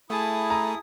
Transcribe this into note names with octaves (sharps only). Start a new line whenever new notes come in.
A3 E4 G#4 A5 D#6
A#5